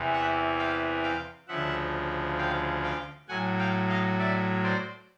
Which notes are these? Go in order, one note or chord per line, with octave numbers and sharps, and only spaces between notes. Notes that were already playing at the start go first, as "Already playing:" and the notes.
Already playing: E2 C3 E3
E5 F#5
F5 G5
F5 G5
D2 C#3 F3 E5 F#5
F5 G5
F5 G5
A2 F#3 F#5 G#5
F5 G5
D#5 F5
D5 E5
C5 D5